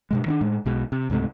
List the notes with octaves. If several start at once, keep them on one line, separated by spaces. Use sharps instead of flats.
G2 B2 G#3
D#3 C#4 D4
A2 G#3
B1 B2 G#3
C3
C#2 G#2 C3 A3